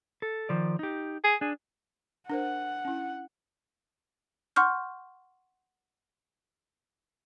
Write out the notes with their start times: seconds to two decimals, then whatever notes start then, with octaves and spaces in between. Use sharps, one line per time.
0.22 A4
0.49 D#3 F3 D5
0.79 D#4 G4
1.24 G#4
1.41 D4 G#4
2.29 D4 A#4 C5 F#5
2.85 C#4 E4
4.56 F#5 C6 C#6 F6 G6